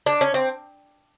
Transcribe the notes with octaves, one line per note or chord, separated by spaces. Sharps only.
D4
C#4
C4